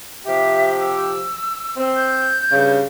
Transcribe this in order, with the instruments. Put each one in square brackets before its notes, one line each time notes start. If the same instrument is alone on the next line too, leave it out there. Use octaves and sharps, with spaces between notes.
[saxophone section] C3 F3 G4 [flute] E5
[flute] E6
[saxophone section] C4
[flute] G6
[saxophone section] G2 C#3